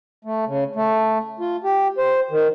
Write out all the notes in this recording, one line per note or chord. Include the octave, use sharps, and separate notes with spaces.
A3
C#3
A3
F4
G4
C5
D#3